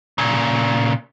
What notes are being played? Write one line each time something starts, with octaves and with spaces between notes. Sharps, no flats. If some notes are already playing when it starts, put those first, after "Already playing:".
A#2 C#3